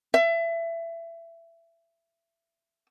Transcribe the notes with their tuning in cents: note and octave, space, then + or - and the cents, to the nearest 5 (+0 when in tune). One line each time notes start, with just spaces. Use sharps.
E5 +20